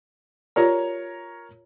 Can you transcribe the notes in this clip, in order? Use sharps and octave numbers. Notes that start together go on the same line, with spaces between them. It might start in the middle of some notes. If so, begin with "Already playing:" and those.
F4 G4 A#4 C#5 D5 A#5